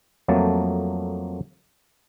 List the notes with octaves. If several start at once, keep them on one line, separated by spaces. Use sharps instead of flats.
F2 F#3 A3 A#3 A5